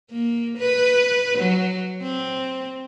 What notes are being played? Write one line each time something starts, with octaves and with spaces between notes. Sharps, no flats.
A#3
B4
F#3
C4